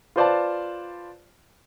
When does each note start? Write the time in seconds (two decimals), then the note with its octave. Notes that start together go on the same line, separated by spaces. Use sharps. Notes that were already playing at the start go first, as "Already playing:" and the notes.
0.16 F4 B4 C5 D5 F5 A5